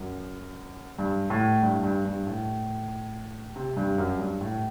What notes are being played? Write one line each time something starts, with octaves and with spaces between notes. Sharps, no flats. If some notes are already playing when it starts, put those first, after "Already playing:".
Already playing: F#2
G2
A2
G2
G2
G2
A2
C3
G2
F#2
G2
A2